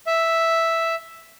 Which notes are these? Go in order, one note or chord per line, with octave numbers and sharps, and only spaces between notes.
E5